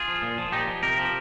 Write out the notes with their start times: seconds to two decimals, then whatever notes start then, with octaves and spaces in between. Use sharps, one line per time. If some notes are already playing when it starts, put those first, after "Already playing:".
Already playing: F4 G#4
0.08 F3
0.22 A#2
0.38 F3
0.52 A#2 D#4 G4
0.68 F3
0.83 C3 G4 A#4
0.98 F3